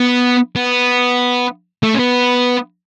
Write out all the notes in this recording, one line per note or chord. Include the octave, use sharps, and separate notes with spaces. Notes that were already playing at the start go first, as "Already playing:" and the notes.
Already playing: B3
B3
A3
C#4
B3